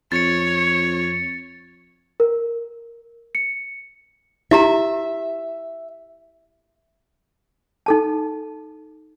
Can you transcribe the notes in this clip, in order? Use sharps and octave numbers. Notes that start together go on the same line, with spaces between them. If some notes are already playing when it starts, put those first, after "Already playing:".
F2 C#5 A6 C#7
A#4
C#7
E4 G4 E5 A#5
D#4 A4 A5